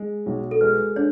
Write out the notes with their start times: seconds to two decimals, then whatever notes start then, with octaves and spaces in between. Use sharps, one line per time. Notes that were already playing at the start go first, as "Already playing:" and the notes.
Already playing: G#3
0.26 B1
0.51 A4
0.61 G#3 B4
0.96 D4 C#5